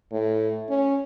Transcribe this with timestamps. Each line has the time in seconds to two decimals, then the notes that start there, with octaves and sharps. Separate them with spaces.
0.12 A2
0.70 C#4